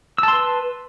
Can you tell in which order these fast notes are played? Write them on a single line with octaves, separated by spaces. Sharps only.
E6 A5 C6 B4